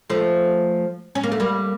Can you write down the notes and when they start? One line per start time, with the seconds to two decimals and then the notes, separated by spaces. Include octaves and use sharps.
0.10 F3 A3
1.15 C#4
1.23 A#3
1.32 A3
1.40 G3 A#3